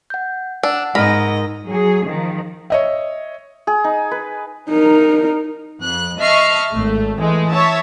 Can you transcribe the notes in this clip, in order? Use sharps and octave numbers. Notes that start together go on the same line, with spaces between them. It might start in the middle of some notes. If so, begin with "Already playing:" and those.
F#5 G6
D4 F#5 E6
G#2 D#4 A#4 D#5 B5
F#3 G#4
D#3 F3
C#5 D#5 E5
G#4
D#4
B4
D#4 A#4
F2 F#6
D#5 E5 A5 C#6 F6 C7
G#1 A3
E3 G#3 A3
C#5 E5 A5